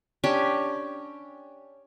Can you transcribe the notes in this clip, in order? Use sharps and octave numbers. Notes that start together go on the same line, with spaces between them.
C#4 D4 G4 C#5